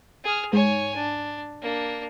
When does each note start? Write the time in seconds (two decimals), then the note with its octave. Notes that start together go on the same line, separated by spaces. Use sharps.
0.24 G#4 F6
0.53 G#2 C#5 G#5
0.96 D4
1.62 A#3 D4